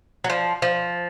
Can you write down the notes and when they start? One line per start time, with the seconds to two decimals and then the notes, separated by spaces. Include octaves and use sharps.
0.24 F#3
0.30 F3
0.62 F3